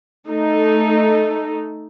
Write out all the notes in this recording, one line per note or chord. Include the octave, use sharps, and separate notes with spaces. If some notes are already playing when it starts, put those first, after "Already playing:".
A3 D#4 A4